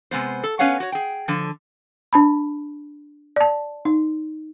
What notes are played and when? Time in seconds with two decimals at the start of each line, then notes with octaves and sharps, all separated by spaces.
0.11 C3 G#3 B3 C5
0.43 A4
0.59 B3 C#4 B4 C#5 F5 F#5
0.80 F#4 C#5
0.92 G#4 G5
1.28 D3 F3
2.13 D4 A5 B5
3.36 D5 A5
3.85 D#4